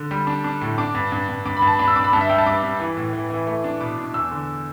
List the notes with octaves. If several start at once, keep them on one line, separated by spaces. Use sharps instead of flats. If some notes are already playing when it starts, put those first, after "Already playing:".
Already playing: D3
G3
D4
D4
A2
D4 D6
G2
G2
G2
G2 D6
B5
G2
A5
D4 B5
E6
G2 D6
B5
G2 A5
E5
G3 G5
A5
G2 D6
G2
E3
A2
E3
E3
A3
D4
B2 D6
D4
E2 E6
D3